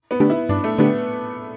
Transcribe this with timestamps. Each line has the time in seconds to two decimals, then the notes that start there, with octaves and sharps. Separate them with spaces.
0.11 B3
0.20 D3 A3 D4 G4
0.30 E4
0.49 G2 D4
0.64 A3
0.78 D3 A3 B3 D4 G4